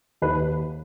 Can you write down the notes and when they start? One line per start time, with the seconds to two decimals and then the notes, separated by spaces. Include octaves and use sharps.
0.22 D#2 B4